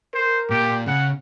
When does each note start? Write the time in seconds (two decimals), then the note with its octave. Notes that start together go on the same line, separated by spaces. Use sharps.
0.14 A#4 C5
0.50 A#2 G4
0.87 C#3 F#5